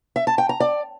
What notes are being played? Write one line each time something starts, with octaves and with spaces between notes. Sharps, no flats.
E5
A5
G5
A#5
D5